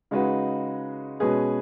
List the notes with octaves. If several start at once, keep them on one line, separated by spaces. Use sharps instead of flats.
C#3 G#3 D#4 F#4 B4
B2 G#3 C#4 G#4 B4